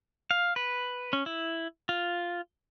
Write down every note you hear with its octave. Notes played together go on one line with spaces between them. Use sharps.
F5
B4
C#4
E4
F4